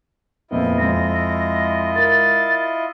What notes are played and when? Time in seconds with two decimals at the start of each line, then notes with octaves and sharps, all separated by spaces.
0.51 F2 A#2 B3 E4 F4 D#5
0.78 F2 G#3 A#6
1.95 A#4 A6